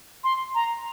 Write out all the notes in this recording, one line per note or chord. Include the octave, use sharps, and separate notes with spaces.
C6
A#5